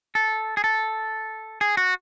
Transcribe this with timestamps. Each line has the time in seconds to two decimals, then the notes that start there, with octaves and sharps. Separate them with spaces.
0.15 A4
0.57 G#4
0.64 A4
1.61 G#4
1.77 F#4